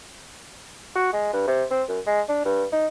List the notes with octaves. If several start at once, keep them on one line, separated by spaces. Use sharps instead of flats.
F#4
G#3
G2
C3
C4
F#2
G#3
D4
G2
D#4